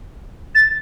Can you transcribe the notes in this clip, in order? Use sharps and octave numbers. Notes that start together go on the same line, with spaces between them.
A6